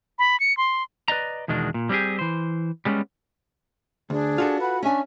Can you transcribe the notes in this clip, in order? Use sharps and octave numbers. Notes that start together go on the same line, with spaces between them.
B5
C#7
C6
B4 D5 D#5 A#5
E2 B2 D#3 G#3 D4
A#2
G3 C4 C#4 G4 G#4
E3 C5
G3 G#3 A#3 B3 C#4
D2 D4 G#4
F4 F#4 A4
B4 F#5 B5
C#4 D4 E5 G#5 C#6